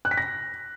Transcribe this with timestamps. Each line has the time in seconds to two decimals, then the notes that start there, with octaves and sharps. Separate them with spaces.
0.05 F#6
0.11 B6
0.17 A#6